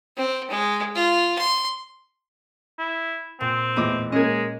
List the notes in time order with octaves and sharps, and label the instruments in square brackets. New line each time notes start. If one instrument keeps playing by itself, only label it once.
[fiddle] C4
G#3
F4
C6
[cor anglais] E4
[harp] A#2 [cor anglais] C4
[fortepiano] E2 A2 D6 [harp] E4 D#5
[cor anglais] G#3 [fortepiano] A#3 C#4 [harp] D#5 G#6